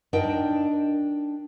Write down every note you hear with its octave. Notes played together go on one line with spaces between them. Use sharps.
D4 D#4 A#4 G5